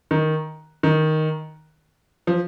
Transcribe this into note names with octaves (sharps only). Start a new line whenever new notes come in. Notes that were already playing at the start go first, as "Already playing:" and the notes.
D#3
D#3
F3